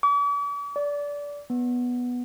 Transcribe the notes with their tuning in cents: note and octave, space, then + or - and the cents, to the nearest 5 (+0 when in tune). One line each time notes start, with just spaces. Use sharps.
D6 -45
D5 -20
B3 -5